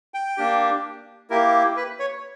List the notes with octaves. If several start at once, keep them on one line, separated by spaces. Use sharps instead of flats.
G5
A#3 D4 G4
A#3 E4 G4 A#4
B4
C#5